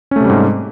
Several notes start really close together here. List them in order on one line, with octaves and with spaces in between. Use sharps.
C#4 A3 C3 G3 G#2